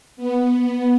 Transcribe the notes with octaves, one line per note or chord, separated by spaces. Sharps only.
B3